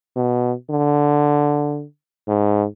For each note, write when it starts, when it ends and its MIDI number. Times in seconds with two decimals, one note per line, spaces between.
0.16 0.53 47
0.70 1.84 50
2.28 2.65 44